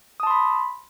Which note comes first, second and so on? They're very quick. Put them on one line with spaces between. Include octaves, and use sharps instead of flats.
D#6 A5 C6 B5